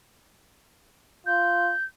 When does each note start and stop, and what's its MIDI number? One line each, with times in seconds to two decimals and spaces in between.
1.26 1.72 65
1.26 1.84 91